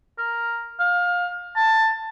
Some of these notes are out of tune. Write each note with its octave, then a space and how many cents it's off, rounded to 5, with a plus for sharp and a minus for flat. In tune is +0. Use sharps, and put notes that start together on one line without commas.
A#4 +0
F5 +25
A5 +15